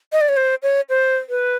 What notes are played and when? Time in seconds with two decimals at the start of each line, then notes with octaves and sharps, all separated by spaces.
0.12 D#5
0.21 D5
0.29 C#5
0.37 C5
0.63 C#5
0.89 C5
1.29 B4